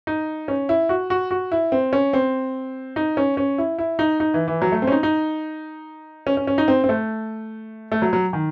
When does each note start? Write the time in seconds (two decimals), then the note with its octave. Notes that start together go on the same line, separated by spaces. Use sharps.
0.07 D#4
0.48 C#4
0.69 E4
0.89 F#4
1.10 F#4
1.31 F#4
1.52 E4
1.72 C4
1.93 C#4
2.13 C4
2.96 D#4
3.17 C#4
3.37 C#4
3.58 E4
3.78 E4
3.99 D#4
4.20 D#4
4.34 E3
4.48 E3
4.62 F#3
4.72 A3
4.82 C4
4.87 C#4
4.92 D#4
5.03 D#4
6.27 C#4
6.37 C#4
6.47 C#4
6.58 D#4
6.68 C4
6.84 C4
6.89 A3
7.92 A3
8.02 F#3
8.13 F#3
8.33 D#3